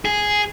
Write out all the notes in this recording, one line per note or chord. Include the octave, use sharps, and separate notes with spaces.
G#4